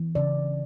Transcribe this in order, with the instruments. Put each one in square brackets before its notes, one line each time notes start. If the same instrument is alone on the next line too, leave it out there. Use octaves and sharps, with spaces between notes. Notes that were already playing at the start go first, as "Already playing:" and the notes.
Already playing: [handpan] E3
C#3 D5